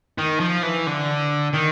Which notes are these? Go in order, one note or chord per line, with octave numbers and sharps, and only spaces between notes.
D#3
F3
E3
D3
D#3